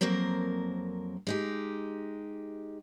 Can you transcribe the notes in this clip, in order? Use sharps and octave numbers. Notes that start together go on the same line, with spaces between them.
F2 F#3 A#3 C4 A#4
G#3 D#4 G4